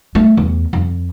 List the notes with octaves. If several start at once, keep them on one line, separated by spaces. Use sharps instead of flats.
A3
E2
F2